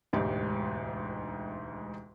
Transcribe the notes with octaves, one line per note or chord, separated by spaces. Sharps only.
E1 D2 G#2 D#4 G4